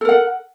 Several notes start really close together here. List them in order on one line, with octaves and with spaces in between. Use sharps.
A4 A#4 F#5